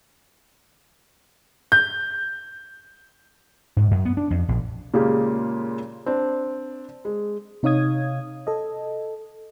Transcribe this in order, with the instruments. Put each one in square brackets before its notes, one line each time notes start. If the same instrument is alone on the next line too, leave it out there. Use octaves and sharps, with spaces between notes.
[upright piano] G6
[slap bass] G#2
F#2
B3
D4
F2
A#1
[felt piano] A#2 C#3 G#3 A#3 F4 G4
C4 D4
G#3
[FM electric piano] C3 D#4 C#5 F5 D#6 G#6
A4 D#5